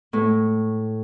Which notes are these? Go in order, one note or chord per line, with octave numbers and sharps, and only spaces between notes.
A2